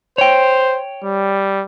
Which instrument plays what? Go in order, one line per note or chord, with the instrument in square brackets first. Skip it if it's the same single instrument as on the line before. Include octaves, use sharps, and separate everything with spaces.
[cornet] C5 [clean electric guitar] C#5 G5
[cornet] G3